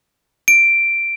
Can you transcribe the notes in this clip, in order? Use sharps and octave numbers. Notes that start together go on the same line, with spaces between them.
D7